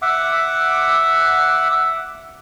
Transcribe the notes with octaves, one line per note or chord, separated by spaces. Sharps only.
E5 F#5 D6